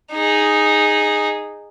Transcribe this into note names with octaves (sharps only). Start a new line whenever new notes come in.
D#4 G#4